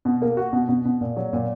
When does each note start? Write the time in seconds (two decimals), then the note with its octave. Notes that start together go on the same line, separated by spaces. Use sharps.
0.05 B2
0.22 A#3
0.37 F#4
0.53 B2
0.69 B2
0.85 B2
1.01 A#2
1.16 F#3
1.33 A#2